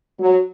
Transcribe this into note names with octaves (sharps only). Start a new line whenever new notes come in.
F#3